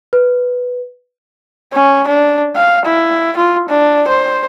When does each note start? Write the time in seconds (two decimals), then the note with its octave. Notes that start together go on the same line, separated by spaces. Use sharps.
0.13 B4
1.73 C#4
2.07 D4
2.56 F5
2.85 E4
3.37 F4
3.69 D4
4.08 C5